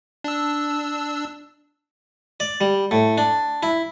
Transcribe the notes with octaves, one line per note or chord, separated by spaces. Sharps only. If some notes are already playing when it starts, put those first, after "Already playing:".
D4 E6
D5
G3
A2
D4
E4